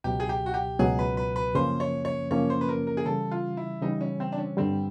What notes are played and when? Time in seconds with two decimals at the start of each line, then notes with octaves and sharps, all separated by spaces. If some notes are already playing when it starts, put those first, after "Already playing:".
0.04 C#2 B2 F#3 G4
0.20 G#4
0.29 G4
0.46 F#4
0.54 G4
0.79 C#2 B2 F#3 G#4
0.99 B4
1.17 B4
1.36 B4
1.55 F#2 C#3 F3 A#3 C#4 C5
1.80 C#5
2.05 C#5
2.31 F#2 C#3 F3 A#3 C#4 C#5
2.50 C5
2.61 B4
2.69 A#4
2.87 A#4
2.97 G#4
3.06 C#3 E3 G3 A4
3.31 F4
3.57 E4
3.82 C#3 E3 G3 D#4
4.01 C#4
4.20 C4
4.32 D4
4.38 C#4
4.57 G2 D3 G3 C4